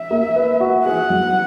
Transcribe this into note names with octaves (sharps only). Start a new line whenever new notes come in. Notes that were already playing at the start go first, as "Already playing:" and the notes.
Already playing: E5
A#3
B4
F#4
G#4 F#5
F#3